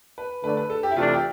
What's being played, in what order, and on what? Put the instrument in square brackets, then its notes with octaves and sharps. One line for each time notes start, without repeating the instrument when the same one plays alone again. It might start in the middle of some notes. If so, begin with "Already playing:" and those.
[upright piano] B4
[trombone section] D3 A3 D4 [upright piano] B4
[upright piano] B4
A4
G4
E4
[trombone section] C3 E3 A3 D4 [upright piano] F4
[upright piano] G4